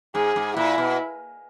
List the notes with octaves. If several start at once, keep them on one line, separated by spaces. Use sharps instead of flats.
G#2 G#4
G#2
A#2 E4
B2